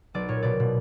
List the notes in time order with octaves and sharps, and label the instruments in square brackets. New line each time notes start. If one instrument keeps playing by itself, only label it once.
[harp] B1 D5
A#2 C#5
B2 D5
B2